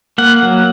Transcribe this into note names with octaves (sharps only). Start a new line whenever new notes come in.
A#3 F#5
F#3